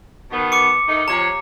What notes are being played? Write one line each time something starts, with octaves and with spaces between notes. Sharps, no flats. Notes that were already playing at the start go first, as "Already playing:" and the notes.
B2 D#3 B3
D6 C#7
D#3 A3 D#4
C3 F3 C#5 A#5